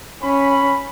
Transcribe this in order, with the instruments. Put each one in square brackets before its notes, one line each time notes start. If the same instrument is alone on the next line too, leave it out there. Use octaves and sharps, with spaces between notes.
[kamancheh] C#4 [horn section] B5